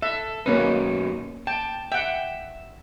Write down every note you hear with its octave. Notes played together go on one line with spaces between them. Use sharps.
A4 E5
F#2 B2 A#3 C#4 D#4 B4
G5 A5
E5 F#5 G5